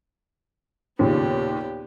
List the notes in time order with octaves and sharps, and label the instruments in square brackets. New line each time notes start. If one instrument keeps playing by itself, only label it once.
[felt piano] D#2 A#2 C#3 [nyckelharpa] B3 G4